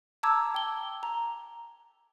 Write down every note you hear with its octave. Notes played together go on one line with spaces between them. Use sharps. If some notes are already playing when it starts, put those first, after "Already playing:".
A5 A#5 D6 E6 G#6
G5 G7
A#5